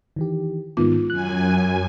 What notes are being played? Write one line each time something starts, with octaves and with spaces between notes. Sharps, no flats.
D#3 E3 G4
G#2 D#3 B3 F4
F#2 G#5 F#6